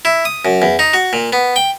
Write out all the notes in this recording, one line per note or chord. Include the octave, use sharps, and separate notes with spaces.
E4
D#6
F#2
E2
D#4
F#4
A#2
B3
G5